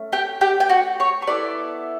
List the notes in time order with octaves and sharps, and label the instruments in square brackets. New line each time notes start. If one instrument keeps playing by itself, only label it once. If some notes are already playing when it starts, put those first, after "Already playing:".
Already playing: [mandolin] A3 C#4
G4 G5
G4 G5
G5
F#4 F#5
C#5 C#6
C#6
B3 E4 A4 D5 D6